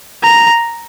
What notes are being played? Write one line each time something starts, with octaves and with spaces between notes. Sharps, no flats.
A#5